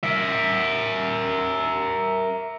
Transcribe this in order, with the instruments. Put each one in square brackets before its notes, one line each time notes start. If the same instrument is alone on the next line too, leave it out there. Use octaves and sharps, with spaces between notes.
[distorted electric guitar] A#4 E5